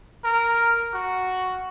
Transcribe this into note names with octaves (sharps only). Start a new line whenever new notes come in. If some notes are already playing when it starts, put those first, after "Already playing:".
A#4
F#4